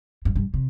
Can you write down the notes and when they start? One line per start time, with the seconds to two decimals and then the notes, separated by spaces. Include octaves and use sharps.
0.25 G2
0.36 G2
0.54 C3